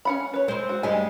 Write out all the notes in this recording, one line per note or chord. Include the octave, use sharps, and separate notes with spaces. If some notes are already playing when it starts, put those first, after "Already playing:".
C#4 F#5 B5
B4 C#5
G#3 C4 C5
F#4
G2 G3 G#3 G#5